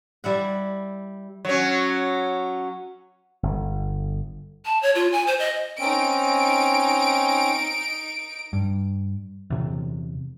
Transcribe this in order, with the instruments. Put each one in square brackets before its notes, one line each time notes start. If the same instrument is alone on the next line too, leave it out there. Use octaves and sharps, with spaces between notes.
[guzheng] G3 E4 F#5
[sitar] F#3 C#4
[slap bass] G1
[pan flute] A5
C#5
F4
G#5
C5
D#5
[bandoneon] C4 C#4 [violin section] D#4 D7
[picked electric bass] G2
E2 C3